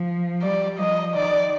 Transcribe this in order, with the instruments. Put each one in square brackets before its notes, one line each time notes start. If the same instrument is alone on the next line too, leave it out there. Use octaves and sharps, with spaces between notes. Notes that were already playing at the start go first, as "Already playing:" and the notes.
Already playing: [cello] F3
[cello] G3 [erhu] D5
[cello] F3 [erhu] D#5
[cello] D#3 [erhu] D5